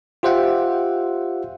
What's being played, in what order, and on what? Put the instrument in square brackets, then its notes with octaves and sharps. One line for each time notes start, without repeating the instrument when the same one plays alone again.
[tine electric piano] F4 G4 C5 E5 F#5 G5